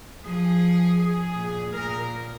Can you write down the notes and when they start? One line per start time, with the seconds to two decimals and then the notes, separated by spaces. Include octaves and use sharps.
0.24 F3 G#4
0.99 G#4
1.35 A#2
1.72 A#2 A#4